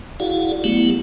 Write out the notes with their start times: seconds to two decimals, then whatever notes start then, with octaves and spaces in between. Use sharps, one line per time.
0.20 E4 F#4 G#4 D5 F5 F#5
0.64 F#3 A3 B3 E4 G4